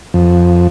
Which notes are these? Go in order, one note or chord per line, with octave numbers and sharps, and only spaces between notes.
F2